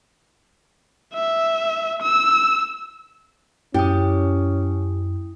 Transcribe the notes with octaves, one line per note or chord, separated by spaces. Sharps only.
E5
E6
F#2 C#4 E4 G4 G5 D#6